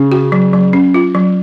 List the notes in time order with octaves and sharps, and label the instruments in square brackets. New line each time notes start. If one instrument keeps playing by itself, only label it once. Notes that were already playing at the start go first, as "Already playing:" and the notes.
Already playing: [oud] C#3 [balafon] C#4
[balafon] F#4
F#3
F#3
C#4
F4
F#3